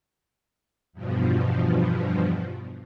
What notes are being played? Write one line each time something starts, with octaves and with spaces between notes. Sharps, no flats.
E2 G2 B2 F3